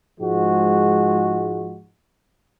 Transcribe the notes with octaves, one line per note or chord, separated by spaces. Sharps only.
G#2 F3 G#3 F#4